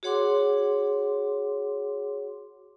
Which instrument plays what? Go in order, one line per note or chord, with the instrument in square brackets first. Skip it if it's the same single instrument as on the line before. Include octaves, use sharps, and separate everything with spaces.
[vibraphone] F#4 G#4 C#5 F#5 C6 D6